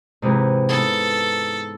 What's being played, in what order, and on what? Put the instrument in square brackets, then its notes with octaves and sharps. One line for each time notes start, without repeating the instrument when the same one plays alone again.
[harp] G#2 C3 E3
[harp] B3 D#4 [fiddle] A4